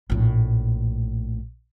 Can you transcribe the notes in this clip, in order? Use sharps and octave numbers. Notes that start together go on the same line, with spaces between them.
A#1 A2